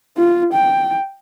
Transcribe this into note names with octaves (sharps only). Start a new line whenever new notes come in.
F4
G5